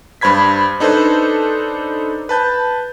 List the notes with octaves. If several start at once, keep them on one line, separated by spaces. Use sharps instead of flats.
G2 C5 B5 G#6 B6
D4 D#4 A4 B4 C5
B4 A5 G6